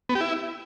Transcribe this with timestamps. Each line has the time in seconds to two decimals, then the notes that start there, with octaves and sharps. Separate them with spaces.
0.09 B3
0.15 G4
0.21 E4